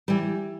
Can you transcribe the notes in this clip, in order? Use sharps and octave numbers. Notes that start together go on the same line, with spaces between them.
E3 G3